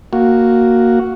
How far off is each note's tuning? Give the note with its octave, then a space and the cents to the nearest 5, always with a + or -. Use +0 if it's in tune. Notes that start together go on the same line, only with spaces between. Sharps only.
A#3 +0 F#4 +0